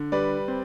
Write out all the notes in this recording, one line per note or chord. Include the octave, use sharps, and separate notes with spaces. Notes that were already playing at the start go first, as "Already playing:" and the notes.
Already playing: D3
G3 B4 D5
C4